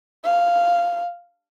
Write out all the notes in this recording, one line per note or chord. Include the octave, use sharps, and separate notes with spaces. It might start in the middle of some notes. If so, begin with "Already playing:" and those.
F5